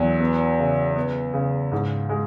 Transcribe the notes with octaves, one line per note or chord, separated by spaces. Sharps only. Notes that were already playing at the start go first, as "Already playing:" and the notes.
Already playing: E2 F#3
B3
C#3
B3
C#3
G#2
G#3